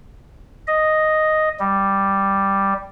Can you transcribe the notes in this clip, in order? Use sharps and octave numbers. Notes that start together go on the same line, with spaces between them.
D#5
G3